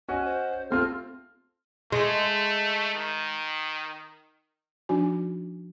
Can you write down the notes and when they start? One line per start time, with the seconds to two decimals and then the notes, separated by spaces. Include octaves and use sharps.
0.08 C#4 F#4 D#5 G#5
0.25 C5
0.70 A3 C4 F4 F6
1.92 G#3 A3
2.95 D#3
4.89 F3 D4 D#4 F#4 G#5